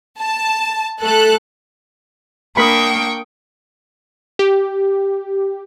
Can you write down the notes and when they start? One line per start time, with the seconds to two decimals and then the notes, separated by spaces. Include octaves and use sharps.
0.20 A5
1.02 A3 A4 F#6
2.57 A#3 D4 A#4 G5 B5 C#6 D#6
4.39 G4